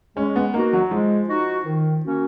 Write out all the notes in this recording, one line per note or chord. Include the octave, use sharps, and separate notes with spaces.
G#3 C#4
B3
A#3 D#4 F#4
F#3
F3 G#3
D#4 F#4
D#3
A#3 C#4 F#4